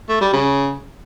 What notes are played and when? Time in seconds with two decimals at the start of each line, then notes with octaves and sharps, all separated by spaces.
0.09 A3
0.21 G3
0.33 C#3